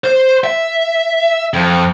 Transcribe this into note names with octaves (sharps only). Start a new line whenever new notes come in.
C5
E5
F2